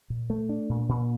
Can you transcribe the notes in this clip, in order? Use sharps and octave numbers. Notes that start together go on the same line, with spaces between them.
A#2
A3
D4
A#2
A#2